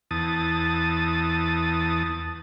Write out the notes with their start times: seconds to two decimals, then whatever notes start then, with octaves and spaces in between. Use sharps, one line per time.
0.11 E2 A5 D#6